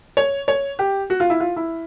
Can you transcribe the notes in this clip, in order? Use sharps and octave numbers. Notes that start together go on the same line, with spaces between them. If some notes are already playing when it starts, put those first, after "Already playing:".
C#5
C#5
G4
F#4
F4
E4
F4
E4